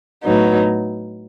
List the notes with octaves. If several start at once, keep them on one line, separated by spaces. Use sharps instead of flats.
A2 F#3 B3 D#4